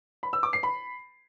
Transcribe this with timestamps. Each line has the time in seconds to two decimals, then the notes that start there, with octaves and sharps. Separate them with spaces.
0.23 B5
0.33 E6
0.43 D6
0.53 C7
0.63 B5